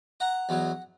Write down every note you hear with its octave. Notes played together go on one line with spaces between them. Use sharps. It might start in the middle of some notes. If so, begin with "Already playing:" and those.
F#5 A#5
E2 B2 F#3